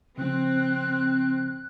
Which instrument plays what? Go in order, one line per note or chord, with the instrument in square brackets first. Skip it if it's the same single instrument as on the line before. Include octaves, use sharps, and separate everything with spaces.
[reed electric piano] C#3 F3 [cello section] C4 [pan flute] F#6